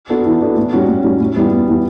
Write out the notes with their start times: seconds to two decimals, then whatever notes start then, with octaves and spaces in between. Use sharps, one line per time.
0.09 B3 D4 F#4 A4
0.26 E3
0.41 B3 D4 F#4 A4
0.57 A2
0.73 G3 C#4 F#4
0.88 A2
1.04 G3 C#4 F#4
1.20 A2
1.36 E3 G3 B3
1.52 A2
1.68 E3 G3 B3